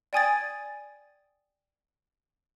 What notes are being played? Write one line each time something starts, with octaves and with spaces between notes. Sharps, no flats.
D5 G5 G#5 D#6 G#6 A6